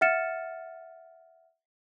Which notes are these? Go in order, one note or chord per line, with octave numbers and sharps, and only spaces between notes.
E5 F#5 F6 A6 C#7 E7